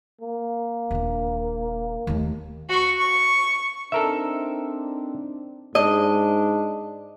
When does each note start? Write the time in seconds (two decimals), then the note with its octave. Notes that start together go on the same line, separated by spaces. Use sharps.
0.21 A#3
0.91 D#1 D4
2.07 D#2 A3
2.69 F#4 C#6
2.98 C#6
3.92 C4 D4 D#4 A4 A#4 E5
5.75 G#2 D4 D#5